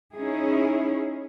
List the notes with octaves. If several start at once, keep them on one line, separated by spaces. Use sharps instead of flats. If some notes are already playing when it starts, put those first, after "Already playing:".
C#4 D#4 E4 G#4